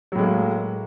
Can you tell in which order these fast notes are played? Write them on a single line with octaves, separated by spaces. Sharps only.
F#3 A2 G#3 A#3